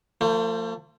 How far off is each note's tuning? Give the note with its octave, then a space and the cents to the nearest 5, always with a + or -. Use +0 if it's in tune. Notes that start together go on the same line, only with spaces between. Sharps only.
F3 +0 A3 +45